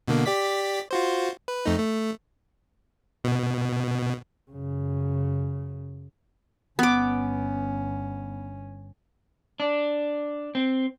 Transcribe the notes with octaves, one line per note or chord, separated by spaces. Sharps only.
B2 D3 A#3
G4 D5 B6
F4 F#4 C5
B4
F2 A3 D#4
A3
B2
F#2 C#3
G1 B3 C#4 D6
D4
C4